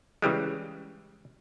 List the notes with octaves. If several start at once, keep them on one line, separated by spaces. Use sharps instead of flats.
C#3 E3 G3 G#3